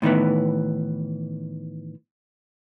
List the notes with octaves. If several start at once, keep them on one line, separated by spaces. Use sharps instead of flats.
A2 D#3 E3 B3